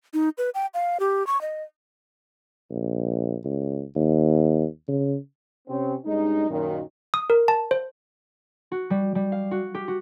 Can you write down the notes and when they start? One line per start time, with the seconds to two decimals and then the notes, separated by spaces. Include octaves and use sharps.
0.14 D#4
0.38 B4
0.55 G5
0.74 F5
1.00 G4
1.27 C#6
1.41 D#5
2.70 A#1
3.44 C#2
3.95 D#2
4.88 C#3
5.68 C3 C4 C#4
6.05 G2 G#3 C#4 D#4
6.49 F#2 A#2 D#3
7.14 D#6
7.30 A#4
7.48 A5
7.71 C5
8.72 F#4
8.90 G3
9.15 G3
9.32 F5
9.51 F#4
9.74 G4
9.88 F#4